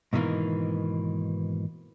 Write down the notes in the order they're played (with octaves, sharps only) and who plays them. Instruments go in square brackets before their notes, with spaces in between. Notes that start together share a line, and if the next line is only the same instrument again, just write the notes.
[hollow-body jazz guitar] G#2 B2 D#3 E3 A#3